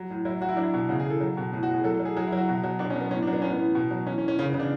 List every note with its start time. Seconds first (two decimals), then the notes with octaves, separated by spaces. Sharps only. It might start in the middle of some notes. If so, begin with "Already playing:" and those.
Already playing: F#3
0.10 A2
0.25 F#3 E4
0.41 F#3 F#4
0.48 E4
0.57 F#3 D4
0.63 E4
0.74 B2
0.89 C#3 F#4
0.99 G#4
1.05 E3
1.10 A4
1.21 F#3
1.37 B2
1.53 A2
1.63 F#4
1.69 A2
1.74 G#4
1.84 F#3 A4
1.94 A4
2.00 F#3
2.05 G#4
2.17 F#3 G#4
2.27 E4
2.32 F#3 F#4
2.49 B2
2.64 F#3
2.79 B2 D4
2.90 C#4
2.96 F#3 B3
3.11 A2 C#4
3.23 D4
3.27 F#3
3.33 B3
3.42 A2 C#4
3.50 B3
3.59 E3
3.75 B2
3.91 F#3
4.07 E3 C#4
4.18 C#4
4.23 E3
4.28 C#4
4.39 C#3 C#4
4.49 B3
4.54 C#3
4.60 D4